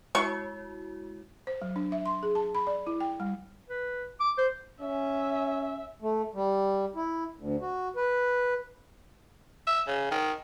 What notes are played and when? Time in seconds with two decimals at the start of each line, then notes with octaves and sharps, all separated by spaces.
0.15 G#3 E4 F#4 C#6
1.47 C5
1.62 F#3
1.76 D4
1.92 E5
2.06 C6
2.23 G#4
2.35 A5
2.55 B5
2.67 D5
2.87 E4
3.00 G5
3.20 G3
3.69 B4
4.20 D6
4.38 C5
4.81 C#4 E5
6.02 A3
6.34 G3
6.96 E4
7.38 D2
7.61 F#4
7.96 B4
9.67 E5
9.87 C#3
10.11 D#3